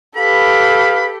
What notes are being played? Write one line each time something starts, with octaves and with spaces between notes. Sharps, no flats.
G4 A4 B4 F5 B5